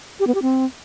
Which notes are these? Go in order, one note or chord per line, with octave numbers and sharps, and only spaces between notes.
G4
B3
G4
C4